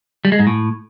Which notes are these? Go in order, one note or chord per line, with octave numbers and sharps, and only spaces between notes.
G3
G#3
G#2
A2